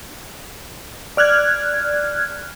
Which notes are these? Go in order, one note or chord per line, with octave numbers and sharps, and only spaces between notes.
D5 F6 F#6 G#6